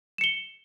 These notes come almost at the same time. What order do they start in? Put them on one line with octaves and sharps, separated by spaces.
E7 C#7 G7